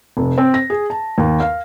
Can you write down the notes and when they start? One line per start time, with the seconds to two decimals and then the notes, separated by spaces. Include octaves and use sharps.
0.17 F1
0.38 C4
0.54 A#6
0.70 G#4
0.90 A5
1.18 D#2
1.40 F5